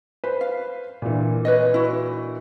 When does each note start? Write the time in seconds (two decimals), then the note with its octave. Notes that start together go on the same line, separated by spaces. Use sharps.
0.24 B4 C5
0.41 F5
1.02 A#2 D3 E3
1.45 B4 C#5 D#5
1.74 E4 F#4